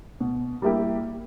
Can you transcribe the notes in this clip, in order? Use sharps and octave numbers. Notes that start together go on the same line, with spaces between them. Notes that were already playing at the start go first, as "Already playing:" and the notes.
B2
G3 A#3 E4 G4